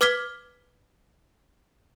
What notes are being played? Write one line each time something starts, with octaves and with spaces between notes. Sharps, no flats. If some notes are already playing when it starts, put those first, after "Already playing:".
B4 D6 F6 G#6 B6 G7